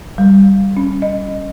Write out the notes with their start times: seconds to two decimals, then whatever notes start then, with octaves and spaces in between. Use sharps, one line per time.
0.18 G3
0.77 C#4
1.02 D#5